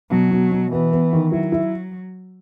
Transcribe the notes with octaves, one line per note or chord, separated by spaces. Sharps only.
B2 F#3
B2
B2
E3 B3
B3
D#3
F#3 E4
E4